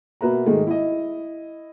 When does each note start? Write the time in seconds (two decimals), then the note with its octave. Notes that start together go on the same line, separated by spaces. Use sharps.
0.21 B2 A#3 B4 E5 A#5
0.46 G#2 D#3 G#3 A3
0.67 E4 D#5